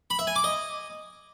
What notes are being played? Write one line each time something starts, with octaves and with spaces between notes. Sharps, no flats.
B5
E5
G#5
D6
D#5